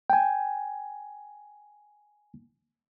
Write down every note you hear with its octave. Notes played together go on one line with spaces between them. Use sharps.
G5 G#5